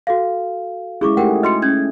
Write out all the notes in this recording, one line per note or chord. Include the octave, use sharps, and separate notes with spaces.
F#4 A4 F5
G#3 C#4 E4 G#4 C#6 D6
A3 D#4 G4 G#4 A#4 F#5 G5
F#4 B4 D#5 C6 C#7
C#4 G#6